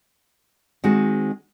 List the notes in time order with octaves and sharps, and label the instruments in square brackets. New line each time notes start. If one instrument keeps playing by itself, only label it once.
[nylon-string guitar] D#3 G#3 C4 D#4 F#4